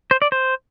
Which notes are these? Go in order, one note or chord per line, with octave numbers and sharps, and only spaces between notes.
C5
D5
C5